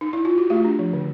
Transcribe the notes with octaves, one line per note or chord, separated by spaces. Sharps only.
D#4
E4
F4
F#4
A3 F4 G4
D4
F3
D3